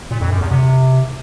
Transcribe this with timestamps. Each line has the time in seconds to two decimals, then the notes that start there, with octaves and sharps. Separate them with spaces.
0.11 A#2
0.21 F2
0.31 F#2
0.41 E2
0.51 C3